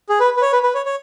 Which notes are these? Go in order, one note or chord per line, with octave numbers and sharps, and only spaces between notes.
G#4
B4
B4
C#5
B4
B4
C#5
C#5